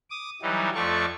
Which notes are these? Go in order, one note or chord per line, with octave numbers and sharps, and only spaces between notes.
D6 D#6
E3 F#3 G3 D#4
F2 A3 F4 D5 C#6